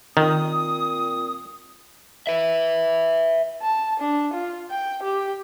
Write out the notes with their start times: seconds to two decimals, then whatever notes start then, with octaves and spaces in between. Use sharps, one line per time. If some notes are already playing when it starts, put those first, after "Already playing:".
0.17 A#2 D#3 C4 D#6
2.27 B4 E5
3.62 A5
4.00 D4
4.34 F4
4.71 G5
5.03 G4